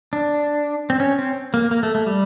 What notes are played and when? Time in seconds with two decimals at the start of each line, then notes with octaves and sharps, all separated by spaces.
0.13 D4
0.90 C4
1.00 C#4
1.19 C4
1.54 A#3
1.71 A#3
1.83 A3
1.95 A3
2.06 G3